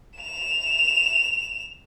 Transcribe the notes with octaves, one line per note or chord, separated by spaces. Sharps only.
E7 F7